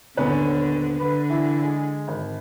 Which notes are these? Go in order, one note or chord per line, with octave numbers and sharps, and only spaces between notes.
D#1 D3 B3 C#4 B4
D3 B4
E3 E4
G#3 G#5
G#1